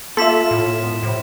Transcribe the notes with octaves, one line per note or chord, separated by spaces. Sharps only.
A#3 F4 A4 E5 C6 B6 E7
A2
A#2 G#3 B3
A2 C3 F3